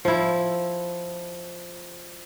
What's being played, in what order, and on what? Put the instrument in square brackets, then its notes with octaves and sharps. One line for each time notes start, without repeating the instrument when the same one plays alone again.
[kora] F3 E4